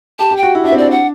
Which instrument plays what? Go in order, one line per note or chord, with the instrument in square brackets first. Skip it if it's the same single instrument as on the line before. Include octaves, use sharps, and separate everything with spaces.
[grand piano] G4 [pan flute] A5
[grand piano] G4
[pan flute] G5
[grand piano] F#4
E4
[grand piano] D4 [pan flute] E5
[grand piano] C4
[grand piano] D4 [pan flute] D5
[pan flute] F#5